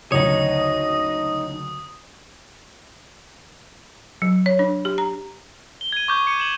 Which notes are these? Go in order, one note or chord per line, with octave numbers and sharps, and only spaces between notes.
F#1 D2 D#3 D#4 C#5 D#5 D#6
F#3
C#5
D4
G4
A#5
G7
G#6 D#7
C#6 D6 G6
C#7 D#7
E7 F#7